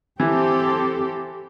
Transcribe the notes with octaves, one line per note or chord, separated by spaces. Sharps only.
E3 C4 G4 A4